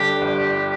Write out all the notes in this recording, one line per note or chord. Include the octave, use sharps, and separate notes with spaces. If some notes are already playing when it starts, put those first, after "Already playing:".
Already playing: G1 G2 D3 G4
G1